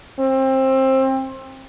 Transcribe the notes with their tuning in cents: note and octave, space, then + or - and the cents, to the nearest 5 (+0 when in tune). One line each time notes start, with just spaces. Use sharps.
C4 +25